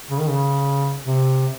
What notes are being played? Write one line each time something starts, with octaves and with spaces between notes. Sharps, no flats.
C#3
D#3
C#3
C3